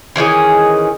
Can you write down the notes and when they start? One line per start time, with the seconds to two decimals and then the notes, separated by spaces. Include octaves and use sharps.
0.16 D#3 E3 C#4 G#4